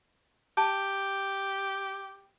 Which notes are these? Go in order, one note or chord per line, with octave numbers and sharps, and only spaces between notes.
G4 A5